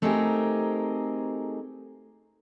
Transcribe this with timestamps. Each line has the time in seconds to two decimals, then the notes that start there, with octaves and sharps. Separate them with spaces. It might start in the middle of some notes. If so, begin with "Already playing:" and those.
0.02 A3 C4 D#4 G4 G#4 A#4